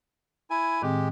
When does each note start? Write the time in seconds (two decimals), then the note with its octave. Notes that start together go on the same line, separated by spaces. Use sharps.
0.50 E4 G#5
0.82 A2 D#3 G#3 C4 G4